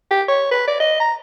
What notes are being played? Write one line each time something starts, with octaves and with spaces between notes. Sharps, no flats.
G4
C#5
B4
D5
D#5
A#5